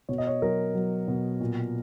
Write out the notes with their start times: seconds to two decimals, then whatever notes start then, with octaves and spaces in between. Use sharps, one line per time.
0.09 B2 C#5
0.18 D#5
0.27 C#5
0.42 F#3 A#4
0.75 F#3
1.08 B2
1.41 A#2